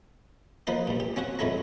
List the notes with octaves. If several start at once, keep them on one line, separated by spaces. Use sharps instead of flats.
F3 A#3 D#4 B4 C5
G2 A#2
G4
C4 C#4 F#4 F#5
F2 G#2 E4 A4 C#5 A#5